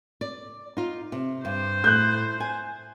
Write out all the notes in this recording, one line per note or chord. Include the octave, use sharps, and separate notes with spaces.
D5
D#4 F4
C3
G2 C5
A2 F#6 G6
G#5